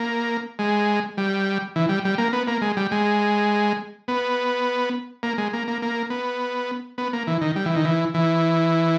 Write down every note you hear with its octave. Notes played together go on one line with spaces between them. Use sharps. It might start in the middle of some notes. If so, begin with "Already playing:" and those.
Already playing: A#3
G#3
G3
E3
G3
G3
A#3
B3
A#3
G#3
G3
G#3
B3
A#3
G#3
A#3
A#3
A#3
B3
B3
A#3
E3
D#3
G3
E3
D#3
E3
E3